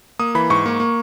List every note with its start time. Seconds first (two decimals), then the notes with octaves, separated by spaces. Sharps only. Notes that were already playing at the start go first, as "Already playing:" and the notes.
0.19 A#3 D#6
0.35 E3 B5
0.50 G#2 C#6
0.66 A#3
0.80 A#3